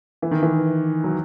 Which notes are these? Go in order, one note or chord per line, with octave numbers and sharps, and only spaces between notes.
E3
D#3
E3
F#3